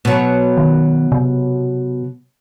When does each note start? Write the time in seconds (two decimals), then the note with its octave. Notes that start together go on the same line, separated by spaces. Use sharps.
0.05 B2 F#3
0.57 D#3
1.12 C3